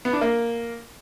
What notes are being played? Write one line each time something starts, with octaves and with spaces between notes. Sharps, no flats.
B3
D4
A#3